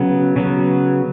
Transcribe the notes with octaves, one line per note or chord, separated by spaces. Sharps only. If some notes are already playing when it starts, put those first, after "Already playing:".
Already playing: C#3 F#3 B3
C#3 F#3 B3